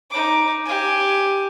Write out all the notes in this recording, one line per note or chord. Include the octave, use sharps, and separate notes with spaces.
D#4 D6
G4 G#5